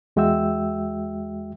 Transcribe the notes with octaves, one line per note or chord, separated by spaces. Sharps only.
E2 G#3 F#4 E5 G5 E6